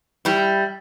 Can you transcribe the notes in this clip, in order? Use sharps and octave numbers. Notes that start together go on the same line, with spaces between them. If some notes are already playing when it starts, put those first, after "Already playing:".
G3 E4